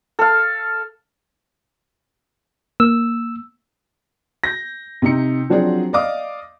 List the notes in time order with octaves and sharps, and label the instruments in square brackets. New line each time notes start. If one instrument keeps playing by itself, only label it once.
[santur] A4 F5
[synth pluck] A#3 [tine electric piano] E6
[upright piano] G6 A#6
C3 D#4 C#7
F3 F#3 C4 D4 F#4 G#4
D5 D#5 F5 D6 D#6